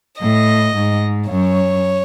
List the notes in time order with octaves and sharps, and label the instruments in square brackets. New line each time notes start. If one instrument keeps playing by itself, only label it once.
[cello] A2 [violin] D#5
[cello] G#2
[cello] F#2 [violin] C#5